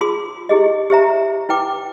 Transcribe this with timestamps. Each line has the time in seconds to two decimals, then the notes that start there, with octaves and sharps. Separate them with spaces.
0.01 F4 G#4 C6 D#6
0.49 E4 G4 G#4 D#5
0.90 G4 C5 E5 A#5
1.49 E4 B4 G5 D6